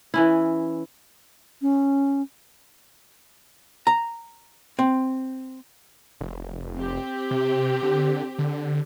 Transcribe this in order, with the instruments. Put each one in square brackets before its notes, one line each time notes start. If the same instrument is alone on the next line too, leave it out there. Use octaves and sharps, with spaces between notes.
[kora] E3 C#4 E4
[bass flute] C#4
[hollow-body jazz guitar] A#5
C4
[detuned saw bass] F1
[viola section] C4 G4
[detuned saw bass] C3
D3
D3